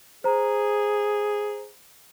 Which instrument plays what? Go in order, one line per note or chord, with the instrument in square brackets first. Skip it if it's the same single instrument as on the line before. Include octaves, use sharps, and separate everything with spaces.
[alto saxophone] G#4 [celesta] C5 A#5